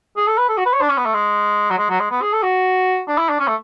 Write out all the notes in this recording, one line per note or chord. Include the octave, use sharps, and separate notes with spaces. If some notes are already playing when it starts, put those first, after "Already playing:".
G#4
A4
B4
A4
F#4
B4
C#5
D4
C#4
B3
A3
G#3
F#3
G#3
F#3
G#3
B3
G#4
A4
F#4
D4
E4
D4
C#4
A3